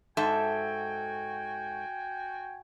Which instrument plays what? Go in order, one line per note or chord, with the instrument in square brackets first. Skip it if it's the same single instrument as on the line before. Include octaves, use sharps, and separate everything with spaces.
[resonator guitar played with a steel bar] G#2 A4 E5 [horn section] F#4 G5 G#5